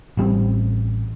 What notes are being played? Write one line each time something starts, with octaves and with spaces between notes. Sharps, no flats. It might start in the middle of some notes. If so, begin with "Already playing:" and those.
A1 G3 A3 C4